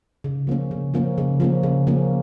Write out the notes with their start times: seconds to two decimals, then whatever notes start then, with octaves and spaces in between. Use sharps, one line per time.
0.24 C#3
0.47 F3 A#3 C#4
0.71 C#3
0.94 F3 A#3 C#4
1.18 C#3
1.40 F3 A#3 C#4
1.63 C#3
1.87 F3 A#3 C#4